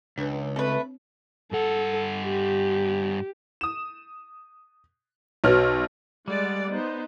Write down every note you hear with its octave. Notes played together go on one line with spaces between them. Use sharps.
C#2 D4 B4
A3 C4 B4 C#5
G2 A4 F#5
G4
D#6 E7
B1 F#4 B4 C#5 F6
G3 G#3 D5 F#5
B3 D#4 C5